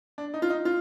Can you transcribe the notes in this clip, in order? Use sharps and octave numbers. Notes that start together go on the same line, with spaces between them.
D4
D#4
F4
D#4
F4